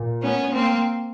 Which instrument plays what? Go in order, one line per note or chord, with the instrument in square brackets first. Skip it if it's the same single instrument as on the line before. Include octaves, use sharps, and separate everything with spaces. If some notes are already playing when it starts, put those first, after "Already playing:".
Already playing: [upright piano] A#2
[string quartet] B3 C#4
A#3 C4